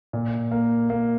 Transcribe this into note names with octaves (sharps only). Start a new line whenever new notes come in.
A#2
A#3
A#3